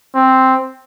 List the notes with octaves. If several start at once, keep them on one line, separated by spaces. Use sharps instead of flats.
C4